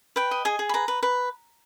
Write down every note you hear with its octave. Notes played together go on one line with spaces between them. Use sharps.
B4 G5
D#5
G#4 G#5
G#4
B5
B4 A#5
B4
B4